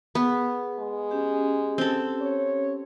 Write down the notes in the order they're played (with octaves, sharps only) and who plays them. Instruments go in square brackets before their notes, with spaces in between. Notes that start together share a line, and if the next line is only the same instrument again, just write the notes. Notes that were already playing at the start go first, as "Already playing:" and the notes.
[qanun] B3 [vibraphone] G#4
[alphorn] G#3
[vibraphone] C#4 G4
[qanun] C4 A4
[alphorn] C#5